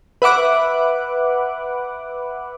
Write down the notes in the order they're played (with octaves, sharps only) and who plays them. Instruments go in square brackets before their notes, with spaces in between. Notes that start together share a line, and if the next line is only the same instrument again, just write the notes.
[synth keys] B4 E5 F#5 D6 F#6